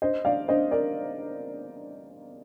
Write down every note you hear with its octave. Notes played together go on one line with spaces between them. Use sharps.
C5 D#5
D5 F5
C5 D#5
A#4 D5